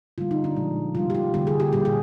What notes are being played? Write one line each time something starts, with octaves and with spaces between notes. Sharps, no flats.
D3 G3 A#3 F4
D#4
D4
A#2 F3 G#3
C3 G3 A#3 F4
G4
F4
D3 G3 A#3 G4
G#4
G4
A#2 G3 A#3 G4
G#4